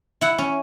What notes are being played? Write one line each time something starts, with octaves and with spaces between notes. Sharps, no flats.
E4 F#5
C#4